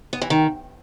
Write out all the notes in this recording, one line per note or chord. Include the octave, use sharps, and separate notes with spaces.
B3
E3
D#3